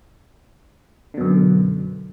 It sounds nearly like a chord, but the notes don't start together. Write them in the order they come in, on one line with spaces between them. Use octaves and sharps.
D3 B2 F#2